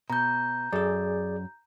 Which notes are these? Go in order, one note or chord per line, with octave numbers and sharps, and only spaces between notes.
B2 A#5 G6
F#2 G#4 A4 D5